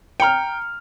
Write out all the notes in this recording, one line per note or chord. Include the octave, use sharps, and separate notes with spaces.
G5 A#5 F6 C#7